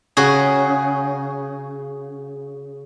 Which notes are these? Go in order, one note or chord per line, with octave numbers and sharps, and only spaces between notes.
C#3 F#4 G#4